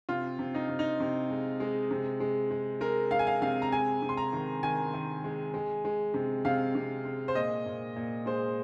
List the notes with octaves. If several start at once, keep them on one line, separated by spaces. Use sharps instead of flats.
C3 F4
C3
D#4
C3
D#4
C3
G#3
G#3
C3
G#3
G#3
G#3 A#4
G#3 F5
G#5
F5
C3 F5
A#5
G#3 G#5
C3
C6
A#5
D#3
D#3 G#5
D#3
G#3
G#3
G#3
C3
C3 F5
C3
G#3
C5
A#2 D#5
A#2
A#2
G#3 C5